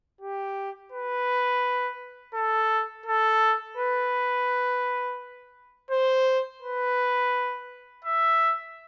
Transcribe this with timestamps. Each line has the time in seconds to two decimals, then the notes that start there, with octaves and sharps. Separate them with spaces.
0.21 G4
0.92 B4
2.34 A4
3.06 A4
3.77 B4
5.91 C5
6.62 B4
8.05 E5